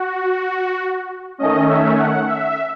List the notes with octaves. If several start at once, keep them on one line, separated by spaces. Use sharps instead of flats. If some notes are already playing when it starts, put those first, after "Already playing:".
Already playing: F#4
D#3 A3 C#4 D#5
E5
F#5
E5